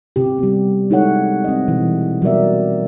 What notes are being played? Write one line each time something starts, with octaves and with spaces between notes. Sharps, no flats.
C3 G4
G3 B3
G#3 D#4 E4 A4 C#5 F#5
C4 D#5
B2 E3
F#3 G3 B3 A#4 D5 E5